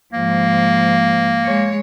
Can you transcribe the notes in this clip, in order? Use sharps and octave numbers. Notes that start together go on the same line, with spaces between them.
G#2 F3 A#3
G#3 C#5